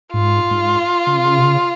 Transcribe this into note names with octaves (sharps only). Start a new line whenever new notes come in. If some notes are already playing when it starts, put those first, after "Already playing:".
G#2 F4
G#2
C#3
C3
C#3
C3
C#3